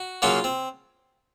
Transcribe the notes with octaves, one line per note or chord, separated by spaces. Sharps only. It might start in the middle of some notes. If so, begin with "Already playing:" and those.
Already playing: F#4
C#3 F#3 A#3 F4
C4